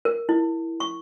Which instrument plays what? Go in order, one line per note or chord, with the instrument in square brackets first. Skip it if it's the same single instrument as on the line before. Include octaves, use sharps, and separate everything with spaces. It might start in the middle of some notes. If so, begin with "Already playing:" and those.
[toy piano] A#4
E4
C#6